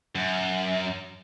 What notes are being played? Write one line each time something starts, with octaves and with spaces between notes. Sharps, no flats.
F#2